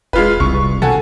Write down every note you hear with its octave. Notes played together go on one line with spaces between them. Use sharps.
E1 G#3 F4 B4
C2 C#6
B2 A4 F#5 G#5